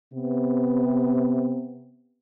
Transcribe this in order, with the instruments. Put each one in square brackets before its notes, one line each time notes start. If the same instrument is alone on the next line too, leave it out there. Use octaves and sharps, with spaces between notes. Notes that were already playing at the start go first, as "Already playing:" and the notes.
[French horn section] C3 B3